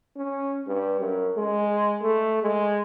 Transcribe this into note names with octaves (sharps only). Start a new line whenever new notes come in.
C#4
G2
F#2
G#3
A3
G#3